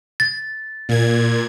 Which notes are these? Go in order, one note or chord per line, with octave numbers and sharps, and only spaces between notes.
A6
A#2 G#6